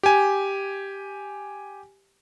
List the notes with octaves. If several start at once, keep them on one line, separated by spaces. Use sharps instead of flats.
G4 G#5